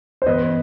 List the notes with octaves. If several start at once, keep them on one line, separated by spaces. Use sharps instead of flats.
C5
G2 E3 B3 B4 D#5